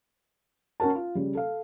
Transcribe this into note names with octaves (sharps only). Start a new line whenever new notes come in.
C#4 F#4 A#4 A5
F4
C#3 G3
A4 F5